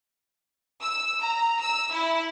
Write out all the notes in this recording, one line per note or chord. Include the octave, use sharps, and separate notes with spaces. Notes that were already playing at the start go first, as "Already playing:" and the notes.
E6
A#5
E6
E4